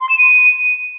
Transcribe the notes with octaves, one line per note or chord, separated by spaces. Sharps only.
C6
E7
D#7